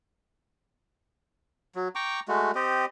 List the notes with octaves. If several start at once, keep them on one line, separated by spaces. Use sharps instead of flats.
F#3
G5 A#5 C#6 D6
G#3 A3 F#4
C4 G4 D#5